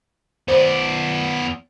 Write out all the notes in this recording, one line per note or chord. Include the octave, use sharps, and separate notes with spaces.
B3 C5 D5